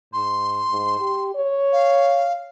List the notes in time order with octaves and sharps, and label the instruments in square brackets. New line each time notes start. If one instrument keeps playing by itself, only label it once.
[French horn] G#2 [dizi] C6
[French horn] G#2
G4
C#5
[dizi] F5